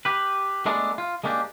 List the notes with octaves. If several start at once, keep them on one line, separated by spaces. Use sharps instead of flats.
G4 B4
G#3 A3 B3 D4
F4
G#3 A#3 C#4 D4 G4